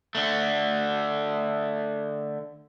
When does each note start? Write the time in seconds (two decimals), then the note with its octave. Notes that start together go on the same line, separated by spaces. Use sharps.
0.15 D3 A3